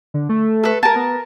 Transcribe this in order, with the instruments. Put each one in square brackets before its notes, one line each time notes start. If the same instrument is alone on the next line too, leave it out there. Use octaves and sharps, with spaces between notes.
[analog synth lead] D3
A3
[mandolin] A4 B4
[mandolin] A#4 A5 [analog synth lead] G#5
[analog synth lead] B3